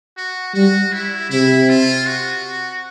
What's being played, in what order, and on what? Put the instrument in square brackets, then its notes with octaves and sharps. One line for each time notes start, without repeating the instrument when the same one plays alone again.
[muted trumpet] F#4
[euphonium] G3 [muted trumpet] F#4
[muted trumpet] E4
[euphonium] C3 [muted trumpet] E4
[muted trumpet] F4
F#4